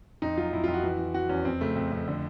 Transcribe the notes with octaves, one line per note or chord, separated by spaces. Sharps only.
F2 D#4
F#3 F4
F2 E4
F4
F2
F#4
E3
E3
E3 F#4
E2 C#4
F2 C4
C#3 A3
F2
F2
D3